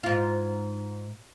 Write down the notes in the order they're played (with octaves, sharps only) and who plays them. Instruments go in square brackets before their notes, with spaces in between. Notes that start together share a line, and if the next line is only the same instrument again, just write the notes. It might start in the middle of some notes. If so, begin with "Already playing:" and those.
[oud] G#2 F4